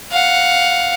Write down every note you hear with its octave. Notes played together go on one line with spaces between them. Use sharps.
F5 F#5